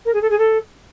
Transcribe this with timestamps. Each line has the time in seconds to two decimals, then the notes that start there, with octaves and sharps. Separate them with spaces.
0.05 A#4
0.13 G#4
0.21 A4
0.30 G#4
0.38 A4